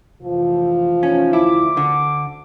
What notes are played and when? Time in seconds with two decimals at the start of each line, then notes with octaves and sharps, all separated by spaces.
0.22 F1 E3 F3
1.03 A3 C#4 D#4
1.33 D2 E4 D6
1.77 D3